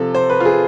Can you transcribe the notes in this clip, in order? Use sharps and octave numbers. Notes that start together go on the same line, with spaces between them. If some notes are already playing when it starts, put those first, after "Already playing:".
Already playing: C3 F3 A4
C5
B4
F4
G#4